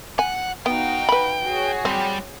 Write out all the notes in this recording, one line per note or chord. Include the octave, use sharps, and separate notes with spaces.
F#5 G#5
B3 D#4 F#4 F5 G5
B4 B5
F#4 G#4 C#5
G3 C4